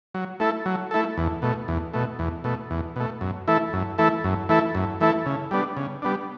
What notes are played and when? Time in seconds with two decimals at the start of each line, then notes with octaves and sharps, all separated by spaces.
0.14 F#3
0.40 A3 E4 A4
0.66 F#3
0.91 A3 E4 A4
1.18 E2
1.42 B2 A3
1.68 E2
1.94 B2 A3
2.19 E2
2.44 B2 A3
2.71 E2
2.96 B2 A3
3.21 F#2
3.48 E3 A3 E4 A4
3.73 F#2
3.98 E3 A3 E4 A4
4.24 F#2
4.49 E3 A3 E4 A4
4.75 F#2
5.01 E3 A3 E4 A4
5.26 C#3
5.51 G3 B3 D4
5.77 C#3
6.02 G3 B3 D4